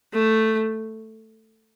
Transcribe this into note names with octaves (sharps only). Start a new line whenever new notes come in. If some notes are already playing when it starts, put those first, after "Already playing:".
A3